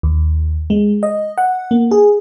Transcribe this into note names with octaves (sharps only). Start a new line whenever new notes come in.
D#2
G#3
D#5
F#5
A#3
G#4